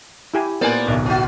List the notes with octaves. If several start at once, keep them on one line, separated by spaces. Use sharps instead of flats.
E4 G4 G#5
A#2 A#3 B3 A#4 C5 D5 G#5
D1 B1 B2
C#4 F4 F#4